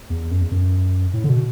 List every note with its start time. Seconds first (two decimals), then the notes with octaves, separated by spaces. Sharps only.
0.10 E2
0.31 F#2
0.41 E2
0.51 F#2
1.13 A2
1.24 D3
1.29 B2